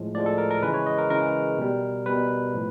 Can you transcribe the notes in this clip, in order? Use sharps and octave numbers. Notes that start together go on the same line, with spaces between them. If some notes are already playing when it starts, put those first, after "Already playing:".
Already playing: A2 F3 G#3
A2 F3 G#3 D5
A4
A#4
A#4
C#3 E3 G#3 B4
C#5
D#5
A#4
C#3 E3 G#3 A#4
B2 G3
B2 G3 B4
A2 F3